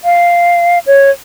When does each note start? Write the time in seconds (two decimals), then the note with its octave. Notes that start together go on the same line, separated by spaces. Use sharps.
0.04 F5
0.87 C#5